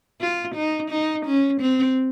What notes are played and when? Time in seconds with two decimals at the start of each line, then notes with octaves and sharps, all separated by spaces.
0.20 F4
0.55 D#4
0.91 D#4
1.26 C#4
1.61 C4